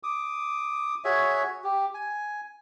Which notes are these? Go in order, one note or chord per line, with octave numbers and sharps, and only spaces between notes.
D6 D#6
F#4 G#4 C#5 E5
G4
G#5